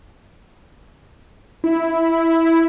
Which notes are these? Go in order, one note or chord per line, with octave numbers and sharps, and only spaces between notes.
E4